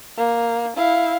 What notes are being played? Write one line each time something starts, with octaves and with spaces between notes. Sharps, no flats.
A#3
E4 F5